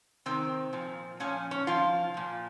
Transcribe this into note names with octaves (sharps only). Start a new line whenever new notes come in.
C3 D#3 C4
A#2 F3
A#2 F3 C#4
C#4
C3 F3 F4
A#2 F3